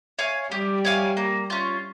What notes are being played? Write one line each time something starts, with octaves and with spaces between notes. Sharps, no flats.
C#5 F5 G#5
G3 G4
C#5 F5 G#5
A#3
C#4 F4